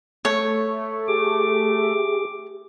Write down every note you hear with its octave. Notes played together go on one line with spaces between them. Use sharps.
A3 C#5
G4 G#4 D6